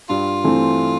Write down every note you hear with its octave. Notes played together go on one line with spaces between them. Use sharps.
G2 F4
E3 A3 C4